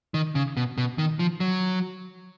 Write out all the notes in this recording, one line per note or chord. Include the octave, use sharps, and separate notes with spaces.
D#3
C#3
B2
B2
D#3
F3
F#3